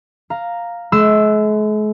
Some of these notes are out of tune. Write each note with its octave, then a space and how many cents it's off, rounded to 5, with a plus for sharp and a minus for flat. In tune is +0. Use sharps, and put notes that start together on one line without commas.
F5 +0 A#5 +0
G#3 +45 C6 -40 E6 +0